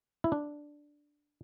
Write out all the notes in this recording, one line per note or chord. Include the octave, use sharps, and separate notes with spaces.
E4
D4